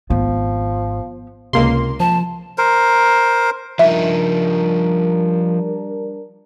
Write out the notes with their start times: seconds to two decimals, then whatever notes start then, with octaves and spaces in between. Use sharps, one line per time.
0.10 G#1 F3 B3
1.53 C#2 C3 A#3 C6
2.00 F3 A5
2.58 A#4 C5
3.79 F3 G3 D4 D#4 A#4 E5